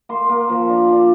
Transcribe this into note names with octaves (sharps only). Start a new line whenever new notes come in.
A#3 C6
A#3
F3
D4
D4